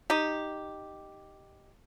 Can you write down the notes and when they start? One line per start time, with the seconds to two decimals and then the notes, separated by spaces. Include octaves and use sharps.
0.10 D#4 G4